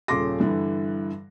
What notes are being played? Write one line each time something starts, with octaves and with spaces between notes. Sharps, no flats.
D#1 C#3 A4 C6 D6 A#6
G2 D3 E3